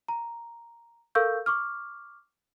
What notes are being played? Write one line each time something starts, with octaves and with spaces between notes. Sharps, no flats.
A#5
A4 A#4 F5 C#6 E6 G6
C#6 D6 F6